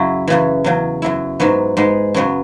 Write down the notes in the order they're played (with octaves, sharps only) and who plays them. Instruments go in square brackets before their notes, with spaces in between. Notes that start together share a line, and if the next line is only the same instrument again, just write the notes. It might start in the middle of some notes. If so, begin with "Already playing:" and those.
Already playing: [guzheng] F#2 C#3 F#3 E4
F#2 C#3 E3
E2 C#3 F#3
F#2 F#3 E4
G#2 F#3 B3
G#2 G#3 B3
F#2 C#3 F#3 B3